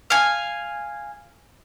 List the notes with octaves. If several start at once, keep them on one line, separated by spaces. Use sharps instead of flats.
F5 G#5